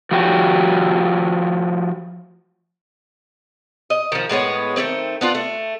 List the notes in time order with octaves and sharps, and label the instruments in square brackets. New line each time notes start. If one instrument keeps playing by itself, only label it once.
[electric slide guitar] F3 A3 F#4 G4
[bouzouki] D#5
D#3 F3
A2 G#3 B3 C#5
D#3 A3 A#3 C4
B3 D4 F4
A3